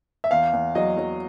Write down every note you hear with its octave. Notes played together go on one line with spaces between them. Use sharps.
E5
E2 F5
E2
F#3 D#5
F#3